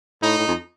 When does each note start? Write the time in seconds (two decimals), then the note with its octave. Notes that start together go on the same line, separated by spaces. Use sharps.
0.23 A2 D#4
0.38 A2
0.48 F2